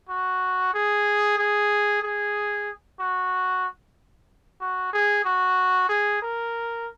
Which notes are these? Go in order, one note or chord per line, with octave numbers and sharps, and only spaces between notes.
F#4
G#4
G#4
G#4
F#4
F#4
G#4
F#4
G#4
A#4